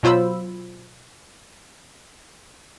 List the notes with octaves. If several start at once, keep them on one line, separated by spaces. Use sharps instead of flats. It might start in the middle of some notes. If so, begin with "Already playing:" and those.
B2 F#3 F4 C5 B5 E6